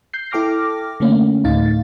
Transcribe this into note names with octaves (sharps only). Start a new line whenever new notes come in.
G6 C7
E4 A4 G5 D6 F6 A#6
D3 A3 A#3 C#4
D2 A2 D#4 F5 A6